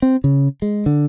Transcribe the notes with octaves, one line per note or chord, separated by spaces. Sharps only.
C4
C#3
G#3
D3